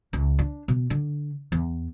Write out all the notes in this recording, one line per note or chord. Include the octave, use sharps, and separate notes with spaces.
C#2
D4
B2
D3
E2